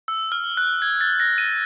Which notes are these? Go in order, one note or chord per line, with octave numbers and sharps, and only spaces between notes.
E6
F6
F#6
G#6
A6
A#6
D#7